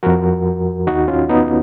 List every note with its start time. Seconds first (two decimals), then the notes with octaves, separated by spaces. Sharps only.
0.03 F2 F3 F#4 A#4
0.87 D#2 D#3 D#4 F#4
1.08 C#4 F4
1.29 B3 D#4